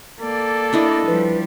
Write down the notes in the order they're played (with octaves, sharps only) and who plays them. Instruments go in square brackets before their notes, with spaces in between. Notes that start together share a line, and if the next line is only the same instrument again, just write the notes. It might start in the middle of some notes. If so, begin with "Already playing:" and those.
[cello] A#3 D5 [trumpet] A4
[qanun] D4 E4 D#5
[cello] F3 G3 [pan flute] B4